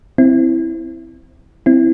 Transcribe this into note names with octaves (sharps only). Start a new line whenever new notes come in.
C4 E4
C4 E4